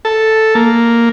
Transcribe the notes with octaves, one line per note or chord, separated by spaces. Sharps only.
A4
A#3